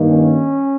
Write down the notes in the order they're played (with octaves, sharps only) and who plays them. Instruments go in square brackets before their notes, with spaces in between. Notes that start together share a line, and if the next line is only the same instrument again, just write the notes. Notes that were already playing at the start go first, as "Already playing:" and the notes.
Already playing: [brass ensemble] G2 D#3 A#3
C#4